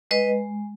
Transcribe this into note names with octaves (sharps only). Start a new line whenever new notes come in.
G#3 B4 D#5